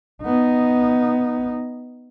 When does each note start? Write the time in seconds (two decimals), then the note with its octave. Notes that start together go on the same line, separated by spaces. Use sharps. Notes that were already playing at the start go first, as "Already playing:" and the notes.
0.23 B3 D#4